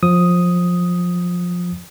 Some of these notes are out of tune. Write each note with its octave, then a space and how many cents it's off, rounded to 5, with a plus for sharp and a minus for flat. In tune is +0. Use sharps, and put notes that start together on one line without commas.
F3 +15 D#6 +0